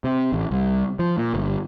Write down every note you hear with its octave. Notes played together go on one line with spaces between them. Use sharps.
C3
A1
C2
F3
A#2
G1